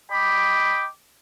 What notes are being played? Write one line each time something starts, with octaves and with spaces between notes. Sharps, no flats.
D#5 G5 B5 D6